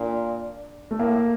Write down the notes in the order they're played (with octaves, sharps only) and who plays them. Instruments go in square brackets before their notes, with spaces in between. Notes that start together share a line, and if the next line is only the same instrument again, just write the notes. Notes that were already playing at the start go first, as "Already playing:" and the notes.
Already playing: [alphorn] A#2 [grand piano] D4
[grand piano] A3
[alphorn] A2 [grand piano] A#3